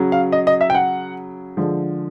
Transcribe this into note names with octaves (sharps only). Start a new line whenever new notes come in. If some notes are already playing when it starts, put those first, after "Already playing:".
Already playing: C#3 F#3
F5
D#5
D#5
E5
G5
F#5
D3 F3 G#3